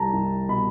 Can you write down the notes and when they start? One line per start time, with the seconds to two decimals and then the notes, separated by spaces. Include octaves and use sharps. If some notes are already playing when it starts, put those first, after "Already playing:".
Already playing: C2 A5 A#5
0.13 C2
0.48 B2 B5